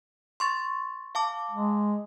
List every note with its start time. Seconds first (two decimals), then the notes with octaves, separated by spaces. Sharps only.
0.40 C6 C#6 A6
1.15 F5 A5 D6
1.51 G#3